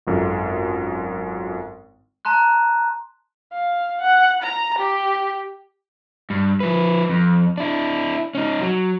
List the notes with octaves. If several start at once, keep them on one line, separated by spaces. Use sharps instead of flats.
G#1 F#2 F4 A4
A5 A#5 C6 F#6
F5
F#5
A#5
G4
G2
F3 B4
F2
D4 E4
C#4 D#4
F#3